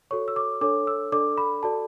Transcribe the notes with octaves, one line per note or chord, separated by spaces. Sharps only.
F#4 A4 C#5 C#6
E6
D6
D4 A4 C#5 D6
E6
D4 A4 D5 D6
B5
F#4 A4 D5 A5